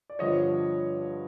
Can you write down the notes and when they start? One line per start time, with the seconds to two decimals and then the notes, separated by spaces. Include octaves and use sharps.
0.10 D5
0.19 G2 D3 F3 C#5 D#5